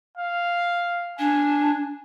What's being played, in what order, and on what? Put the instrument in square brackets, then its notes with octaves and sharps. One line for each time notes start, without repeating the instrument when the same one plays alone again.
[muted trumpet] F5
[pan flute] D4 [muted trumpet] G#5